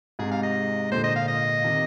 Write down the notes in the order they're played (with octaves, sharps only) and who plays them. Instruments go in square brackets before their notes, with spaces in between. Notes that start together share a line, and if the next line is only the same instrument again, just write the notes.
[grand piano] G#2 C3 [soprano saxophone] G#4
[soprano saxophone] F5
D#5
[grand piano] A#2 D3 [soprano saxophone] C5
[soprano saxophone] D#5
F5
D#5
[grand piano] C3 D#3